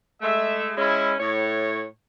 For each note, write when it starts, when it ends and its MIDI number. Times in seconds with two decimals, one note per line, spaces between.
0.22 0.72 56
0.22 0.72 57
0.22 0.72 76
0.76 1.15 56
0.76 1.15 61
0.76 1.15 64
1.20 1.86 45
1.20 1.86 73